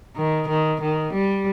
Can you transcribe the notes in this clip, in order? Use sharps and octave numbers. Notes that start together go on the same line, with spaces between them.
D#3
D#3
D#3
G3